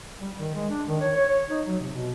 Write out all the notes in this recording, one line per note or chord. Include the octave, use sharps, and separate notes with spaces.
G3
D#3
G#3
D4
D#3
C#5
C#5
C#5
D#4
F#3
C3
B2